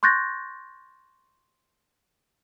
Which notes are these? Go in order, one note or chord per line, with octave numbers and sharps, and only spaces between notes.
C6 C#6 F#6 G6 A6 A#6